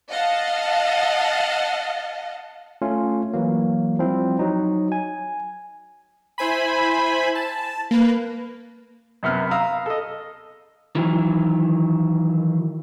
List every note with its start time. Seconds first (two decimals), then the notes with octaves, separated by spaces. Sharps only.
0.10 D#5 F5 F#5 A5
2.82 A3 C#4 F4
3.33 E3 F#3 A#3
3.99 F3 G3 C4 E4
4.39 F#3 D#4
4.92 G#5
6.38 E4 C5 G#5 B5
7.35 A5
7.91 A#3 B4
9.23 F#2 C3 B3 F6
9.51 F5 A#5 D#6 E6
9.86 A4 D#5
10.95 D#3 E3 F#3